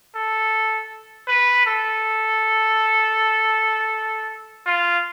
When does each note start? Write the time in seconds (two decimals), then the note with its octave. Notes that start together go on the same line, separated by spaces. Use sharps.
0.16 A4
1.28 B4
1.66 A4
4.66 F4